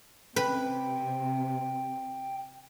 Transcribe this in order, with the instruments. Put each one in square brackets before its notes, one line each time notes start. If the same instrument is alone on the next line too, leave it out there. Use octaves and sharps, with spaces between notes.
[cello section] C3 [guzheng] B4 [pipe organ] G5